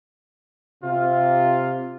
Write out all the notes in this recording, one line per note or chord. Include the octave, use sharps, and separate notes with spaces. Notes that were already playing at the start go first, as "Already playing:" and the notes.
C3 F4